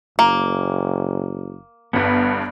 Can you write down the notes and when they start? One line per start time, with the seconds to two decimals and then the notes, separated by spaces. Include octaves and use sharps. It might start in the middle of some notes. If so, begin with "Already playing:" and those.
0.19 F#1 A#3
1.93 G1 G2 B3